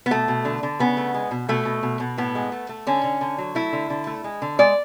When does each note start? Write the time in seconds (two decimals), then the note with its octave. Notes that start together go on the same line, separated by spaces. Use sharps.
0.06 B3
0.11 B2 A3
0.28 B2
0.45 D3
0.63 D3
0.79 C#3 B3
0.97 A3
1.14 G#3
1.31 B2
1.49 B2 A3
1.65 B2
1.83 B2
2.00 B2
2.18 A2 B3
2.35 G#3
2.52 A3
2.69 A3
2.87 D3 C#4
3.04 D3
3.21 D3
3.38 F#3
3.55 A3 E4
3.73 D3
3.90 D3
4.07 A3
4.24 G#3
4.42 D3
4.59 G#3 D5